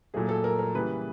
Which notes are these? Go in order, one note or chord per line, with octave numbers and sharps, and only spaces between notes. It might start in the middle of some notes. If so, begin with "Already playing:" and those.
A#2 F#3 A3 G#4
A4
A#4
A#4
C#3 E3 G3 A#3 B4